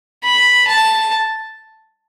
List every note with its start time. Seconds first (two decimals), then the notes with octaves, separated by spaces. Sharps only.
0.23 B5
0.67 A5